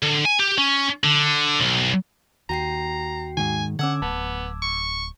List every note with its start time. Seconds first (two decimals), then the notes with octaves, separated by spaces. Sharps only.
0.02 D3
0.25 G#5
0.40 G4
0.58 C#4
1.04 D3
1.60 B1
2.49 D#2 F#4 G5 A#5 C7
3.37 G#2 D#3 G#5
3.79 D3 C#4 F#5 D6 E6 G#6
4.02 D1 B3 A5
4.62 C#6